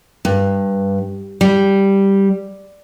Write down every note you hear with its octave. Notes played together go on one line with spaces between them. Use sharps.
G2
G3